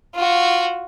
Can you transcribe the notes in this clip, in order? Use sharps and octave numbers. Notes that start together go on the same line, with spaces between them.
F4 F#4